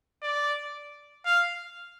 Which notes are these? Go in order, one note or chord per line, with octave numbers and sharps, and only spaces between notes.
D5
F5